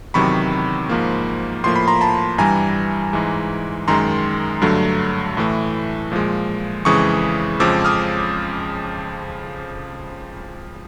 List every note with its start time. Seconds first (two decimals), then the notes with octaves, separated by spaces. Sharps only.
0.14 E2 C3 D#3 F#3 B5 C#6
0.89 G#2 F3 A#3
1.64 A2 F3 A#3 C6
1.76 B5
1.88 A#5 C6
2.01 A5 B5
2.38 G2 E3 G3 G#5 A#5
3.13 G#2 E3 G#3
3.88 F#2 D#3 G#3 A#5 C6
4.62 G2 D3 F#3 A3
5.37 A2 E3 A3
6.12 A#2 F3 G#3
6.85 F2 C#3 E3 G#3 C#6 D#6
7.60 F2 C#3 F3 G#3 D6 E6
7.84 D#6 F6